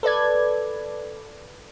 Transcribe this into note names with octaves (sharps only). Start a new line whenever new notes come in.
A4 B4 D5 G#6